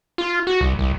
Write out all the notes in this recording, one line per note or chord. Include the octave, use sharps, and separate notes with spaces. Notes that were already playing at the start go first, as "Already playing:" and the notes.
F4
F#4
C2
C2